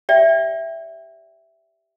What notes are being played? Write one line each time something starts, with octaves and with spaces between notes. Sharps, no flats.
G4 D5 E5 G5